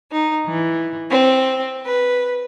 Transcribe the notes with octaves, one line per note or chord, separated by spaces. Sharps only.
D#4
E3
C4
B4